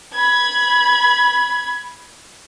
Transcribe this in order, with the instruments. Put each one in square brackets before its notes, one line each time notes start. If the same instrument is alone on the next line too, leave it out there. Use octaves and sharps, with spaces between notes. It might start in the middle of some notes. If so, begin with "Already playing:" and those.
[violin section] B5 G#6